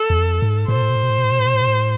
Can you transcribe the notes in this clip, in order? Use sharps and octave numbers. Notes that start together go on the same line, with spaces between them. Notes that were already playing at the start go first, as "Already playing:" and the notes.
Already playing: A4
E2
F2
G#2
A2 C5
B2
A2
B2
A2
B2
A2
B2
A2
B2
A2
B2
A2
B2
A2